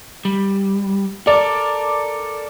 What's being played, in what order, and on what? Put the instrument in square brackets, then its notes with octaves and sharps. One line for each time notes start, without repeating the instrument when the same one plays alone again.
[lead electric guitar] G3
[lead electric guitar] A4 A#4 [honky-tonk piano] D5